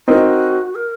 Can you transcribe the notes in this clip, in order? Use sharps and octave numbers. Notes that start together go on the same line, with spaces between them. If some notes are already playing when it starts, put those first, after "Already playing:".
C4 D#4 F#4 A#4 D#5
A#4